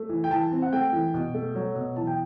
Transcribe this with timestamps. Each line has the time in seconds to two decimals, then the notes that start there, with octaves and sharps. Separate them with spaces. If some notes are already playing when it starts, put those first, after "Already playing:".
Already playing: A3
0.09 E3
0.24 G5
0.30 E3 A5
0.52 C4
0.62 F#5
0.73 A3 G5
0.92 E3
1.14 B2
1.34 A3
1.55 F#3
1.76 B2
1.96 E3 A5
2.07 G5